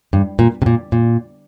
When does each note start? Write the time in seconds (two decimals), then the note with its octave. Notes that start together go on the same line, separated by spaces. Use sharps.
0.13 G2
0.39 A#2
0.62 C3
0.66 A#2
0.92 A#2